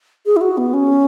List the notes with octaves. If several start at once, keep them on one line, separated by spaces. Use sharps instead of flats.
G#4
E4
F#4
B3
C#4